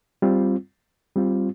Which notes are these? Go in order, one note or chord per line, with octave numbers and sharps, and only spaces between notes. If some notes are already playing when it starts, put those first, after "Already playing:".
G3 C4 F4
G3 C4 F4